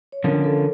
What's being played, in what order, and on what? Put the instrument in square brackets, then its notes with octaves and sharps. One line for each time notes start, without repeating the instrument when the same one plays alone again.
[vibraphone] C#5
[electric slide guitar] D3 F3 C#4 [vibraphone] A#4
[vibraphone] A4